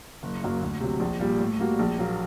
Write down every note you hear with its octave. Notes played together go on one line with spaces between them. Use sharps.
F#1
F#2 F#3 A#3
D2
C3 F#3
A#1
A#2 G3
A2
G3 A#3 F#4
A#1
A#2 F#3 A#3